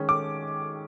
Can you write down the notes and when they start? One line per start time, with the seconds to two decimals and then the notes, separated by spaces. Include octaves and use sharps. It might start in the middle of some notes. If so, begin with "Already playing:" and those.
Already playing: D#3 G#3 C#4
0.09 D6